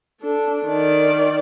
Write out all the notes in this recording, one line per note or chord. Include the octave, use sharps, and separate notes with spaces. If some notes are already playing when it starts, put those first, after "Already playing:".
D4 A4
D#3 D5